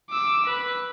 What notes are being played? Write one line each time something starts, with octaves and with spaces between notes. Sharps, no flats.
D6 E6
B4